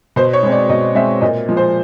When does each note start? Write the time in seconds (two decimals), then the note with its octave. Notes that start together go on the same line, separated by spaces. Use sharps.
0.16 B2 C5
0.33 C#5
0.43 G#3 C4
0.52 D5
0.69 B2 D#5
0.95 G#3 C4 E5
1.21 A#2 D#5
1.49 F3 G#3
1.57 C5